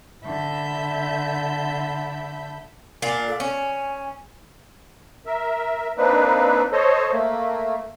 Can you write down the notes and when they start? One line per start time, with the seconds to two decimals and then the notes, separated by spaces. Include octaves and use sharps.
0.24 D3 E5 A5 B5 G6
3.02 A#2 D4 F5 G#5
3.27 A4
3.40 C#4 G#5
5.26 A#4 E5
5.97 A#3 C4 D4 D#4 B4
6.72 A4 C5 C#5 D#5
7.12 A3 A#3